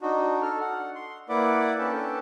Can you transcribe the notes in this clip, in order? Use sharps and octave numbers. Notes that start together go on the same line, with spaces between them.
D4 D#4 F#4
D4 A4 F6
F#5
C6
A#3 E4 B4 D5 F#5 D6
C#4 D4 A4 B4 G5 A5